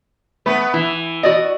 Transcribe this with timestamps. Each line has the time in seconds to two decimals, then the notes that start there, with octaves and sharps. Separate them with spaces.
0.46 A3 B3 B4
0.74 E3 E4
1.23 F#4 D5 D#5